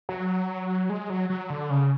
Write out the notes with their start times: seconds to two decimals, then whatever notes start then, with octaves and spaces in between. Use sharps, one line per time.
0.09 F#3
0.90 G#3
1.10 F#3
1.30 F#3
1.50 D3
1.70 C#3